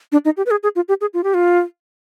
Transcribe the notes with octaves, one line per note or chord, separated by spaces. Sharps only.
D4
D#4
G4
B4
G#4
G#4
F4
G4
G#4
F4
G4
F4